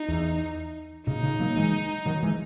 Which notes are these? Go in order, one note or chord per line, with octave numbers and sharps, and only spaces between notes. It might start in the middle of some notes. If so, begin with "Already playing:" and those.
Already playing: D#4
E2
A#2 C#3 D#4
A#2 C#3
F#3 A#3
E3 G#3
D#3 F#3
E3 G#3